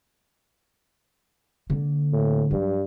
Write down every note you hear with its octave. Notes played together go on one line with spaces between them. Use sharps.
D3 A#3
A2
G2 F#3